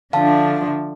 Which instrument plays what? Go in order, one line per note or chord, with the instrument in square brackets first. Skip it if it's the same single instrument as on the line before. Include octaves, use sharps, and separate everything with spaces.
[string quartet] D3 F3 A3 D4 [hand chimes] F5 A5